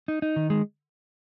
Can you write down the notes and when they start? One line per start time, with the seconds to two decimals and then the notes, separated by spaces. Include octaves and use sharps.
0.08 D#4
0.22 D#4
0.36 D#3
0.50 G#3